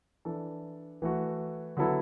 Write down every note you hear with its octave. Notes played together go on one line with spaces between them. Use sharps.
E3 D4 A4
E3 A3 F#4
D3 F#3 B3 E4 A4